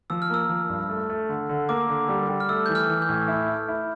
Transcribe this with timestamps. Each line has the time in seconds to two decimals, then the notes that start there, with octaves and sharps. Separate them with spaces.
0.10 F3 E6
0.22 F6
0.30 A#3 E6
0.49 F3
0.69 G2
0.89 A3
1.10 A3
1.29 D3
1.49 D3
1.69 A#3 D6
1.89 D3
2.09 G3
2.29 G3
2.40 F6
2.49 A3 E6
2.66 E3 G6
2.75 F6
2.89 E3
3.02 G6
3.09 A2
3.28 E4
3.48 A3
3.68 E4